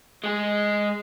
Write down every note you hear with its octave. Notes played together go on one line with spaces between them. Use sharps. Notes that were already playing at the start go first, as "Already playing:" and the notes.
G#3 G#4